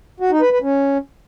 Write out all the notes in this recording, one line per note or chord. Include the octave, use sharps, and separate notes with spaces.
F#4
D#4
B4
B4
C#4